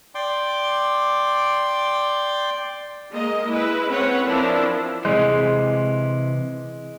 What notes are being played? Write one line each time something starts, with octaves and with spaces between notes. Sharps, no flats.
D5 G5 C6 D6
G#3 A#3 D#5
G#3 E4 B4
C4 C#4 B4 C#5 F#5
F3 C4 D4 E4 A#4
C3 E3 G#3